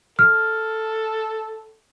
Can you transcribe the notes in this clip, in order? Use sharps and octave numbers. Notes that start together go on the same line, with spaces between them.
A4 F6